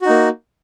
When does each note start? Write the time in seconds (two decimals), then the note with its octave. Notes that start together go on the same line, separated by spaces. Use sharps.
0.02 F#4
0.06 D#4
0.09 A#3